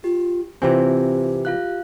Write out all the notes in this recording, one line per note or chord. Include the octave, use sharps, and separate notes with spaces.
F4 G4
C3 E3 C4 F4 G4 C5 G#5
F4 F5 F#6